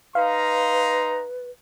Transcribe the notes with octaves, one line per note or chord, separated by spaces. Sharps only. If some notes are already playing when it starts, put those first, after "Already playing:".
D#4 B4 F5 A#5 C6